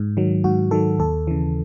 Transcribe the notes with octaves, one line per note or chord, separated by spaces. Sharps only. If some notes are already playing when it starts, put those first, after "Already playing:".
Already playing: G#2
D#3 F#3
G#2 F#4
D#3 F#3 A4
D#2 A4
C#3 E3